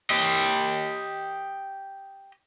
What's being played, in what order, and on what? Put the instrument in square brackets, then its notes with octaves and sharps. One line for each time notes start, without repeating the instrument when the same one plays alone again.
[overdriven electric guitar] G4 D#5